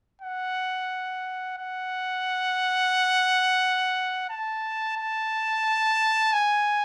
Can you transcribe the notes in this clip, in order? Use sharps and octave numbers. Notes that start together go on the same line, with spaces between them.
F#5
F#5
A5
A5
G#5